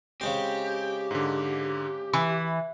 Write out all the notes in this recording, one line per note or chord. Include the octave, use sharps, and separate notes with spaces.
C#3 G#3 C4 G4
G#2 D3
E3 B5